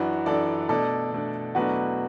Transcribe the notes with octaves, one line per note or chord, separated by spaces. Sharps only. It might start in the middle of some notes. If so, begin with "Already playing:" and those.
Already playing: F#2 E3 D4 F#4 B4
F#2 E3 D4 A4 D5
B2 A3 D4 A4 D5
B2 A3 D4
E2 B2 F#3 A3 D4 F#4 B4